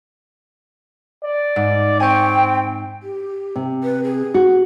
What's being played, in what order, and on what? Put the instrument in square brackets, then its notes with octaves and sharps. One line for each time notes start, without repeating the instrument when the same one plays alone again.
[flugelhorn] D5
[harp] G#2
[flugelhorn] C4 [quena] G5 [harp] G#5 C#6
[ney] G4
[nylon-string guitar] C3
[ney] B4
G#4
[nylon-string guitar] F#4